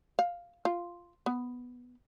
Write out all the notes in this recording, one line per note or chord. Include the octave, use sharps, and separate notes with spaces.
F5
F4
B3